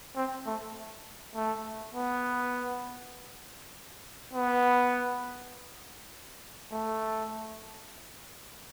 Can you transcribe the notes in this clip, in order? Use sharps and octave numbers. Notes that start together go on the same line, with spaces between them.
C4
A3
A3
B3
B3
A3